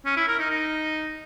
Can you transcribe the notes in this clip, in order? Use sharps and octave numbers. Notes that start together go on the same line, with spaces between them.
C#4
E4
A#4
D#4
D#4